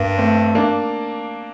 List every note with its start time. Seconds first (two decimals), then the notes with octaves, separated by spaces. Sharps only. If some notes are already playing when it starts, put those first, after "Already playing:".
Already playing: G2 A#3 D4
0.18 A3 C4
0.55 A#3 D4